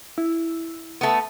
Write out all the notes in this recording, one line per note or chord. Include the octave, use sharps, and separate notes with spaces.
E4
A3 B3